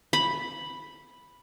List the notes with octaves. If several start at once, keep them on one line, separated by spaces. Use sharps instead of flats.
B5